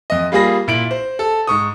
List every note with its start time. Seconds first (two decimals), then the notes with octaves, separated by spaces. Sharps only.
0.10 F2 D#5
0.32 G3 A#3 F4 G#4 B5 A#6
0.68 A#2 E4 D7 F#7
0.91 C5
1.19 A4
1.47 G#2 C#6 D#6